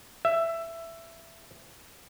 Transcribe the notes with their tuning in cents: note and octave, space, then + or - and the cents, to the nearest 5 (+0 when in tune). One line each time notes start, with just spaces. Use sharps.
E5 +15